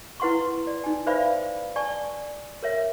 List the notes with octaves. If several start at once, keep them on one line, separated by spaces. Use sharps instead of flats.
E4 B4 F#5 C6 C#6
D5
D#4 G#5
B4 C5 D5 E5 F5 B5
D5 G#5 A5 C#6
A#4 C#5 E5